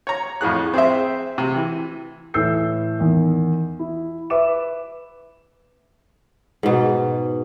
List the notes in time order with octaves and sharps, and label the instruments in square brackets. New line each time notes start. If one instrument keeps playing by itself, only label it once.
[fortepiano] C#5 A#5
F2 A2 G#4 F#6
C4 G#4 C5 E5
C3
E3
[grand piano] A2 E3 A4 E6 G6 C7
E2 D#3
E4
B4 E5 D6 E7
[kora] G#2 B2